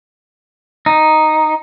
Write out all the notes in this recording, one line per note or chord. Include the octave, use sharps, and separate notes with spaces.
D#4